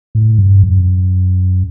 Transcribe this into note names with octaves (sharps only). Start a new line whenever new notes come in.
A2
G2
F#2